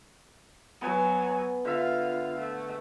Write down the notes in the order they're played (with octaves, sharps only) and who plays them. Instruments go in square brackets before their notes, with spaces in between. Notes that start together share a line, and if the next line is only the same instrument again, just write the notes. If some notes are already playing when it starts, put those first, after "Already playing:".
[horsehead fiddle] F#3 G#5 [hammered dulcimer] B3
[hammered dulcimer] D3 E5 [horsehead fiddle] F4 F5
[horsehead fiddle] A3